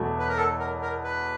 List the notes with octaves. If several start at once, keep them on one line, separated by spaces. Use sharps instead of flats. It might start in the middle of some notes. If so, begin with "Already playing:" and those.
Already playing: E2 B2 F#3 A3
B4
A#4
A4
A#4
A#4
B4